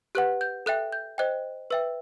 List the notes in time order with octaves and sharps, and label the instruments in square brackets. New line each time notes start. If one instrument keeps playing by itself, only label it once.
[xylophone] G4 B4 F#5 F#6
G6
A4 E5 G5 F#6
G6
C5 D#5 G5 F#6
B4 E5 G5 E6